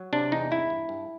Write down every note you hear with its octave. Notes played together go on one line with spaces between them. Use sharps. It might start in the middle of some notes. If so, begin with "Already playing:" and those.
Already playing: F#3
C3 D4
E2 D#4
G2 E4
G2
G2